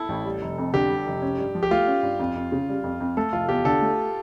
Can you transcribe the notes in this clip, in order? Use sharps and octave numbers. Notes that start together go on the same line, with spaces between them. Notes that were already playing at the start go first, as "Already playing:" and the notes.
Already playing: E4 A4
A1
G3
F1
F2
D3 G4
G3
F1
C#4
G2
F3
G4
A3 F4
C#4
G2
F2
F2
C#3
G3
F2
F2
A3 A4
F1 F4
E2 G4
D3 A4
A3